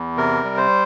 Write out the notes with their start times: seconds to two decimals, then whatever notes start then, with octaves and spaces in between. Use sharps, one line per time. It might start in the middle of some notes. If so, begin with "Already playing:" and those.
Already playing: E2
0.17 C3 A#4
0.44 G3
0.57 C5